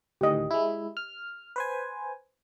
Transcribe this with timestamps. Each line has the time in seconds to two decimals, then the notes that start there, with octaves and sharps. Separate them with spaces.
0.21 D2 A2 D#3 G4 D#5
0.51 G#3 E4
0.97 F6
1.56 B4 C5 G#5